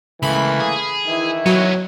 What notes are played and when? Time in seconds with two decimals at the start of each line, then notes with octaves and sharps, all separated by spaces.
0.23 C#2 E3 A3 A#3 B5
0.60 G#4
1.06 D#3 E3 E4
1.46 F#3 B3 C#4